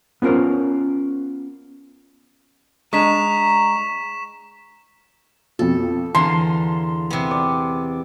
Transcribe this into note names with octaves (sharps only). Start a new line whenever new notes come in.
B3 C#4 F4 A#4 C5
G#3 D4 A#5 C#6 B6 E7
F2 B2 F3 A4
E2 D3 F5 A5 A#5 C6
C3 B3
D5